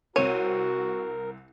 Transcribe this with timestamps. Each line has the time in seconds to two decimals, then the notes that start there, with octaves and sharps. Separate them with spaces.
0.16 C2 C4 F#4 A#4 C#5 D#7